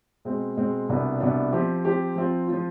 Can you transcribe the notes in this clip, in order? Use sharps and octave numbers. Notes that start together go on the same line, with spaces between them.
B2 G#3 C4
B2 G#3 C4
C2 B2 B3 D4
C2 B2 B3 D4
F3 C4 G4
F3 C4 G4
F3 C4 F4
F3 C4 F4